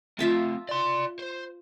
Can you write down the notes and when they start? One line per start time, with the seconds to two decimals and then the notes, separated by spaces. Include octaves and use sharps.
0.19 A3 C4 F4 E5 A5
0.69 D5 C6
1.19 C5